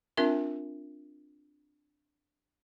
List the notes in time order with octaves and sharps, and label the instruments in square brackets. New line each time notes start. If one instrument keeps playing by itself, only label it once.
[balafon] C4 D4 F4 A#4 E5